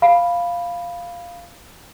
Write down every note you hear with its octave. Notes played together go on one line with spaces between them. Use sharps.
F5 B5